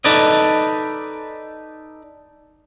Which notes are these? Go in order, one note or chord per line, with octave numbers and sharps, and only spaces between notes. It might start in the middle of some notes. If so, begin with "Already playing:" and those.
D#4 A4 B4 D5 D#5